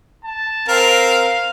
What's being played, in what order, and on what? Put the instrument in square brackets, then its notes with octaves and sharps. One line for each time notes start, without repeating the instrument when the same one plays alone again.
[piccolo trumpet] A5
[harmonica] C4 A#4 [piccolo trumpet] F5